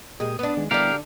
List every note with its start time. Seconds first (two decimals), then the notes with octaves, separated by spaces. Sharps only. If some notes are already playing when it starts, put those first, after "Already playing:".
0.20 A#2 G#3 G4 D#6
0.39 B3 D4 B4 D#6
0.57 D#3 G#3
0.71 D3 G3 B3 D4 E4 G4 A#4 F5